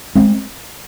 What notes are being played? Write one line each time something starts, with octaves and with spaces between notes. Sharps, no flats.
G#3 C4